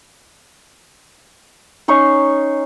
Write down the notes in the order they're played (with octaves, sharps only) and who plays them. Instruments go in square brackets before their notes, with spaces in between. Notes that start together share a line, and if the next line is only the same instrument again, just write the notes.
[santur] C#4 D#4 C6 C#6